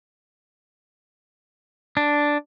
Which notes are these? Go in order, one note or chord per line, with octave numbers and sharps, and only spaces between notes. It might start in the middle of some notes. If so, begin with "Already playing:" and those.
D4